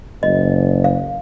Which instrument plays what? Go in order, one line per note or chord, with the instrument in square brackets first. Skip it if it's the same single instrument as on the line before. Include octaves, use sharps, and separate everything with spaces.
[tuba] F#1 [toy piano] D#5
[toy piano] F5